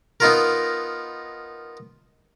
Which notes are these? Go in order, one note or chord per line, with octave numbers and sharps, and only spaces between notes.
B3 D#4 F4 A#4